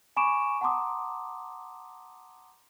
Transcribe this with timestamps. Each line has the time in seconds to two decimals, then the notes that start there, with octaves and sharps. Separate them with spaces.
0.17 G#5 B5 C#6 D6 D7 E7
0.61 F#5 A5 A#5 C6 D6 D#6